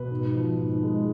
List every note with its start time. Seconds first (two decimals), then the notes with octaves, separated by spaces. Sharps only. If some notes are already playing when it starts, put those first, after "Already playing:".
Already playing: B2 B4
0.11 G#2
0.35 F3
0.59 G#2
0.83 G#3